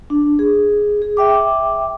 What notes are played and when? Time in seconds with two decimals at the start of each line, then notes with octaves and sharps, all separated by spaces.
0.10 D4
0.39 G#4
1.02 G#4
1.17 E5 G5 D6